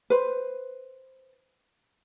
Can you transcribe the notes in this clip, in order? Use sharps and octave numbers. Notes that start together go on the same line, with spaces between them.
B4 C5